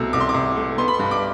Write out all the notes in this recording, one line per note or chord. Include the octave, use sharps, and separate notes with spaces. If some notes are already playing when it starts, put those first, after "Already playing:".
Already playing: C2 B2 A3 E6
C2 D6
C6
D6
C2
A3
B3 C6
B5
C6
G2
D6